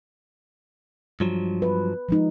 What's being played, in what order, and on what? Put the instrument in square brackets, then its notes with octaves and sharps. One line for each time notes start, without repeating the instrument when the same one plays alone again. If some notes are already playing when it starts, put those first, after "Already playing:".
[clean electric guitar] G2 F3 F#3
[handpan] B4
F3 G#3 D#4